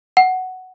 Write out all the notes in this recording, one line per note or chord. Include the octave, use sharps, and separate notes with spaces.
F#5